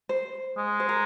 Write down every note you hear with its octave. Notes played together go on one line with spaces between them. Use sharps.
C5
G#3
C5
A#4